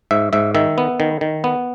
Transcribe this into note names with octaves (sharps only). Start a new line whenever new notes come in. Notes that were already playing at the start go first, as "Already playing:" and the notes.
G#2 E5
G#2 E5
D#3 E5
B3
D#3
D#3
B3